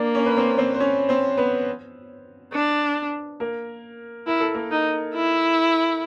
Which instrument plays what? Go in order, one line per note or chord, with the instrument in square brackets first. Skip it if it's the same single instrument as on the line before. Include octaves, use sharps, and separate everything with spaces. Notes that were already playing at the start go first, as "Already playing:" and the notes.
Already playing: [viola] A#3 [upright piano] D4 D5
[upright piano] C#4 C#5
B4
C4 C5
C4 C5
C5
C#4 C#5
C4 C5
B3 B4
[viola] D4
[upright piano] A#3 A#4
[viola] E4 [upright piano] A#4
[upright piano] A4
A#3 A#4
[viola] D#4
E4